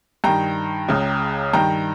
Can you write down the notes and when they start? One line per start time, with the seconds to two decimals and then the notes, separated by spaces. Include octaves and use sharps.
0.24 G2 D#3 G5 A#5
0.89 C#2 C#3
1.53 G2 D#3 G5 A#5